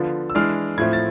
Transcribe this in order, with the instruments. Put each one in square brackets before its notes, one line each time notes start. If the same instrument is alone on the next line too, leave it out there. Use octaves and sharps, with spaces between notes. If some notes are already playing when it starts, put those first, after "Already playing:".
Already playing: [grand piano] D3 F3 B3 F4
E6
E3 G#3 D4 F6
A2 F3 A3 C4 G#6
A6